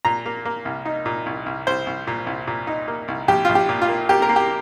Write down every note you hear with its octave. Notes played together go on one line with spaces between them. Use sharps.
A#2 A#5
A#3
A#3
C2
D#4
A#2
C2
C2
C2 C5
C2
A#2
C2
A#2
D#4
A#3
C2
A#1 G4
A#1 F4
G4
A#2
F4
A#3
A#3 G4
A#4
A#3
G4